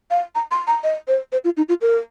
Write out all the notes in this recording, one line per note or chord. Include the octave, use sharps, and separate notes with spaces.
F5
A#5
C6
A#5
D#5
C5
C5
F4
D#4
F4
A#4